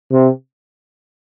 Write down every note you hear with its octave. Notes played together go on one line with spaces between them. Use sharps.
C3